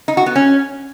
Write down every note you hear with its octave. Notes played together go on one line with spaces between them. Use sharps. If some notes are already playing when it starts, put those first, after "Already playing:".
D#4
F#4
B3
C#4